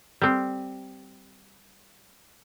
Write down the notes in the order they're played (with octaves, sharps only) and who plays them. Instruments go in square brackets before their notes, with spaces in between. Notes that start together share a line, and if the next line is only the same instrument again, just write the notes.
[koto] G3 C4